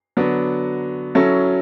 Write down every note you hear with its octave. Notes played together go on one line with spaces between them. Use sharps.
D3 F#3 B3 D4
F#3 C#4 E4 A4